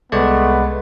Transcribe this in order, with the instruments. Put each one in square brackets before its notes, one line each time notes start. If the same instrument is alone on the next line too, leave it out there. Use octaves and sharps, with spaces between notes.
[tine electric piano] C2 G#3 D5 [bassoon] A3 [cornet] B3